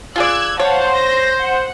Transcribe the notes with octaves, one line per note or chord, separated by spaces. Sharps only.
F4 G#4 D5 E6 F#6 G#6
C5 C#5 F5 F#5 A5
A#6
F#5